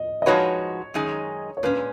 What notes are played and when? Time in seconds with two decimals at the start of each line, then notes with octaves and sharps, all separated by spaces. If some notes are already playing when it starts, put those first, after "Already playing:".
Already playing: D#5
0.22 D#5
0.26 F3 G#3 D#4 F#4 B4 C#5
0.94 F#2 D#3 G#3 D#4 G#4
1.57 C#5
1.63 A#2 G#3 C#4 B4